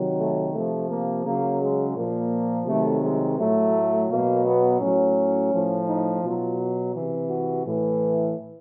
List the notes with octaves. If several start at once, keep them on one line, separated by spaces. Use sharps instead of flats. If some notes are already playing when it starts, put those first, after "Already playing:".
Already playing: C3 D#3 F#3
A3
C3 F3 A3
A#3
C#3 F#3 A#3
G#3
A#2 F3 A#3
C3 D#3 F#3 A3
G#3
A2 F#3 A3
B2 F#3 A#3
B3
A2 F#3 C#4
A2 F3
D#4
B2 F#3 F4
C3 E3
F#4
A2 E3